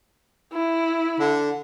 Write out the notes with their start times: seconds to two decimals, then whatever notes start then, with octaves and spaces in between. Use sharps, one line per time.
0.53 E4
1.20 D3